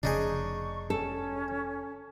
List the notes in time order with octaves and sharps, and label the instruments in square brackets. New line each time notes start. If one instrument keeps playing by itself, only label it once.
[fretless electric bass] F1 C#3 [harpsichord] D4 D#4 G#4 [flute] C#6
[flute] C#4 [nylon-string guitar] A4